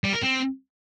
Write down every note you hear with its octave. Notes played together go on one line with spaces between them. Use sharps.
G3
A#4
C4